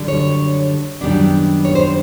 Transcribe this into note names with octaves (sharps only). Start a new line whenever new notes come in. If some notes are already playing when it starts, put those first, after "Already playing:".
Already playing: F#2 D3 G3
C#5
F#2 D#3 G3 B3 D4
C#5
C5